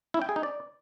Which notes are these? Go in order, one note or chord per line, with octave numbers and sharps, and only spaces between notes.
E4
G5
G#4
D#4
D5